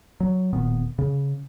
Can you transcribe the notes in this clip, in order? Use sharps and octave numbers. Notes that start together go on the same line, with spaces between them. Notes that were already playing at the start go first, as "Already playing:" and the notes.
F#3
D1 A#2 D#3 B3
C#3